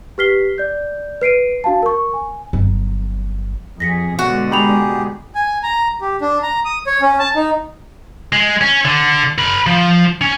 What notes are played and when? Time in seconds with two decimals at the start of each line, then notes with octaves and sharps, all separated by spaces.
0.18 G4 B4 F6 B6 C7 G7
0.58 D5 G6
1.21 B4 C7 D7 D#7
1.64 D4 F#4 F5 A5
1.83 A#4 C#6
2.14 G#5
2.53 G1 F#3
3.80 F2 G#4 A#6 B6 C#7
4.19 B2 D3 G#3 F#4
4.51 G4 G#4 A#5 B5 F7
5.35 G#5
5.63 A#5
6.01 G4
6.21 D4
6.43 A#5
6.65 D#6
6.87 C#5
7.01 C#4
7.19 A5
7.36 D#4
8.32 G#3
8.61 C#4
8.85 D3
9.38 A#4 B5
9.67 F3
10.21 C#4